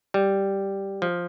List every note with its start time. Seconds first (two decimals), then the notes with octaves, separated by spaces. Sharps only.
0.14 G3
1.02 F3